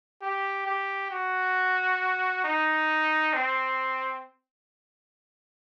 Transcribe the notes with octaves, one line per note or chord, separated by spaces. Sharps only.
G4
G4
F#4
D#4
C4